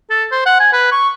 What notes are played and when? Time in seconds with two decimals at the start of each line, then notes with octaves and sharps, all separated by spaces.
0.10 A4
0.32 C5
0.46 F#5
0.60 G#5
0.73 B4
0.92 C#6